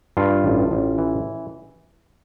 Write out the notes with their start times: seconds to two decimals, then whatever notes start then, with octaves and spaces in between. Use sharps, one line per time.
0.17 G2 F4
0.44 A1
0.71 A1
0.98 E3